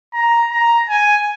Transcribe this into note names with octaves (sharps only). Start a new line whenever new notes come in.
A#5
A#5
G#5